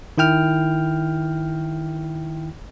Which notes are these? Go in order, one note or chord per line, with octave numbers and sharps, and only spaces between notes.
D#3 E4 G5 F6